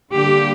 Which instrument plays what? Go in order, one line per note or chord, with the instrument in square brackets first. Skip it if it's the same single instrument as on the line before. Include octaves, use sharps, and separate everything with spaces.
[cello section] D3 G3 A#3 D4 G4